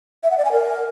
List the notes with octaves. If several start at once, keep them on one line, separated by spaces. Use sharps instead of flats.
E5
F#5
D5
G#5
A#4